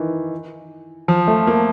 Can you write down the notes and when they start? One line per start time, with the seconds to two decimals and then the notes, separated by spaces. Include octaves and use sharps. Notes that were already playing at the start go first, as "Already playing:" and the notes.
Already playing: D#3 E3
1.08 F3
1.28 A3
1.47 A#3